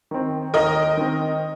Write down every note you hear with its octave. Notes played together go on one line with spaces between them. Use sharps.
D#3 C4
D#2 A#4 D#5
D#3 C4